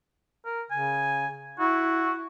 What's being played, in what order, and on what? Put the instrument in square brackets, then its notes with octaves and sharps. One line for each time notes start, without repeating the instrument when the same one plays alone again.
[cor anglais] A#4
[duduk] C#3 [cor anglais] G#5
[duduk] E4 [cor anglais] F#4